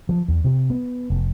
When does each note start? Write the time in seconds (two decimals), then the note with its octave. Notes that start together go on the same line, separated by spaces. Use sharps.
0.09 F3
0.28 E2
0.44 C3
0.70 B3
1.10 F1